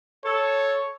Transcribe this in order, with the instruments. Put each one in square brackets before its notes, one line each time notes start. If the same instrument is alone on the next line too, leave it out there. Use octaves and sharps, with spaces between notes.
[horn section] A4 [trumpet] C#5